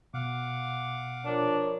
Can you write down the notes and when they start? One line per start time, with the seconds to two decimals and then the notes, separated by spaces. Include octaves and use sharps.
0.14 B2 F5 F#5 D6
1.25 F3 D4 A#4 C#5